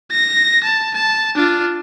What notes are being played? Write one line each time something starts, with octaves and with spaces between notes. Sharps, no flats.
A#6
A5
A5
D4 F4